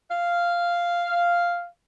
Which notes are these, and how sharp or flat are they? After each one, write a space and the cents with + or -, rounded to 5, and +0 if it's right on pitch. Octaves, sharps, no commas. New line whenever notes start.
F5 -5